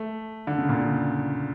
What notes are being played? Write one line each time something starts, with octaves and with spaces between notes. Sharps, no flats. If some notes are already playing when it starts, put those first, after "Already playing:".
Already playing: A3
D3
C#3
A#2
C#3